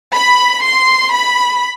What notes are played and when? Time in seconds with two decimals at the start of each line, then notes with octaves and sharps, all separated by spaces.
0.15 B5
0.64 C6
1.12 B5